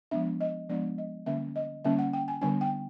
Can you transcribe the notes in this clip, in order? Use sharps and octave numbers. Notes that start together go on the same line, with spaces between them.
F3 G#3 B3 D4 E5
D#5
F3 G#3 B3 D4 D5
D#5
D3 G3 A#3 C#4 E5
D#5
D3 G3 A#3 C#4 E5
F#5
G5
G#5
D3 G3 B3 D4 G#5
G5